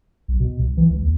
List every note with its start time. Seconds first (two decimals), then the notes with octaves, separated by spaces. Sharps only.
0.28 B1
0.40 B2
0.59 C2
0.77 E3
0.90 C#2
1.03 D#2